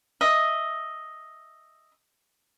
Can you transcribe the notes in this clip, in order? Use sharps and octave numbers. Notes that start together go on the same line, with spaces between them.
D#5 E5